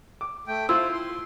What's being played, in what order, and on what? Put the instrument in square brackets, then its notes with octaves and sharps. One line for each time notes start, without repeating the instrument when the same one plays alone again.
[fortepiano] D6
[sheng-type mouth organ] A3 G5
[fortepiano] E4 F4 [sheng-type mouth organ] C5 [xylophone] E6
[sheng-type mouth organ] C6